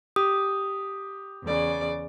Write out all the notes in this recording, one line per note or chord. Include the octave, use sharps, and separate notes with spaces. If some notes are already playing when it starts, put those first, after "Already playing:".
G4 D#6
E2 C#3 D5